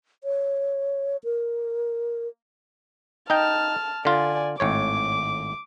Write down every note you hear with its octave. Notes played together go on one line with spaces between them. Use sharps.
C#5
A#4
D#4 D#5 G5 A5 F6
D3 F4 D5 G#5
G#1 A2 C#5 D6